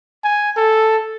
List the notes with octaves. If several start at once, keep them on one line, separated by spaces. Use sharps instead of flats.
G#5
A4